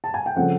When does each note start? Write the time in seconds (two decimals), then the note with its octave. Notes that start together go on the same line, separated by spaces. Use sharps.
0.04 A5
0.14 G#5
0.26 G5
0.36 C#3 F3 A3 C4 F#5